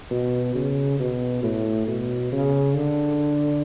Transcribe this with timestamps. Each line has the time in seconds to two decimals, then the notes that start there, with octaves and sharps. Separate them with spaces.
0.11 B2
0.55 C#3
0.99 B2
1.43 A2
1.88 B2
2.32 C#3
2.75 D3